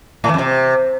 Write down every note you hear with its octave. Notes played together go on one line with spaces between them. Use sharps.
A2
E3
F2
C3